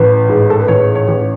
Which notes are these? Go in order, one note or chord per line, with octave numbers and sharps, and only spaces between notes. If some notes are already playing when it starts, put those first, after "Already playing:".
Already playing: A1 B4
G#2
A4
B4
A1 C#5
C#5
A1